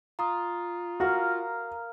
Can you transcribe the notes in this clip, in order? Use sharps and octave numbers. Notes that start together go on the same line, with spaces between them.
F4 A#5 D#6
F#4 A#4 F5